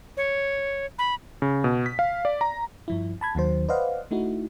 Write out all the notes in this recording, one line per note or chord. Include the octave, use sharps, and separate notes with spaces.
C#5
B5
C#3
B2
B6
F5
D5
A#5
G2 F3 E4
A5 B5 G#6
D#2 D#3 F#3 C5
B4 C5 D5 D#5 F5 F#5
A3 D#4 E4 F#4